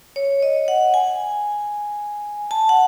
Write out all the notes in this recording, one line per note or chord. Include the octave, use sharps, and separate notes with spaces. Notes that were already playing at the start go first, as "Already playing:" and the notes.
C#5
D#5
F#5
G#5
A5
F#5